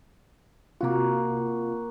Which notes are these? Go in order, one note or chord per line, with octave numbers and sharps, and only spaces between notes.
C3 A#3 F4 F#4